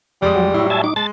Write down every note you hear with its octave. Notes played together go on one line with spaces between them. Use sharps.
F2 G3 G#3 D#6
F#3
A2 F#3 E4
E5 G#5 A5
D#4 D6
G#3 A5 A6